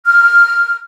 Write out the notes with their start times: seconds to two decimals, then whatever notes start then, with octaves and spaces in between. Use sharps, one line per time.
0.05 F6